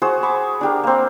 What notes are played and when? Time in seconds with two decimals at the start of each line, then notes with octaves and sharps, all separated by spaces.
0.02 F#4 G#4 C5
0.23 B5 C#6 D6
0.61 D4 G4 A#4
0.84 A#3 C4